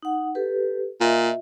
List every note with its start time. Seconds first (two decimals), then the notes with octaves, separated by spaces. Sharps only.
0.02 D#4 F#5
0.35 G4 A4 B4
1.01 A#2 F4 D#5 E5